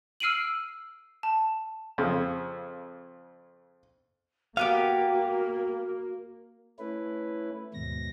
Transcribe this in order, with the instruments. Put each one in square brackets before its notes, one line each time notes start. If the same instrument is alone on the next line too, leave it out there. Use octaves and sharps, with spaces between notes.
[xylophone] E6 F6 C7 D7 D#7 F#7
A5
[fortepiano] F2 C#3
[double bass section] A#3 [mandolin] B3 E4 G4 [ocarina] F#4 [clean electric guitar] F5
[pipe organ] A3 C#4 E4 B4
D#2 G#2 B2 A#6